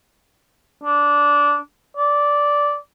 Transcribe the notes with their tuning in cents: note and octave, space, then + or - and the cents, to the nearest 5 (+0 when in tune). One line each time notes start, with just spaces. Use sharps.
D4 -15
D5 -10